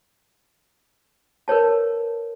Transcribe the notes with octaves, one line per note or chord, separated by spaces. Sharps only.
A#4 B4 C#5 A5